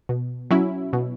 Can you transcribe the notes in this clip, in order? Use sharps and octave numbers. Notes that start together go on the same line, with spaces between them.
B2
F#3 C#4 E4
B2